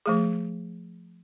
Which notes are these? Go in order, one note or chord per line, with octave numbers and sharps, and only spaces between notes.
F3 A3 G#4